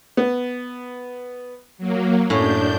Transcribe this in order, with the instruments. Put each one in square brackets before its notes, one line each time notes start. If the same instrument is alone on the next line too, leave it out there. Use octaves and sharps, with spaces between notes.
[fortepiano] B3
[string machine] F#3 A#3
[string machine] F#2 D4 G6 [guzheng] A2 [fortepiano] C#4